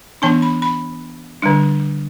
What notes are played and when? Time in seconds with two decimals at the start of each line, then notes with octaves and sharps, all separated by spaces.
0.22 E3 B3 D4 A5
0.42 B5
0.62 B5
1.42 D3 G3 D4